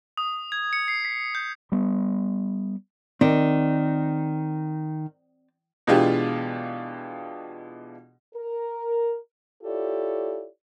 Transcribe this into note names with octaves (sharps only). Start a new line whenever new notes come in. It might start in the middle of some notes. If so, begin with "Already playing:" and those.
D#6
G#6
C#7
C7
B6
G6
G3 B3
D#3 C4 D5
B2 E3 G#3 D4 F4 G4
A#4
E4 F4 G4 A4 C#5 D5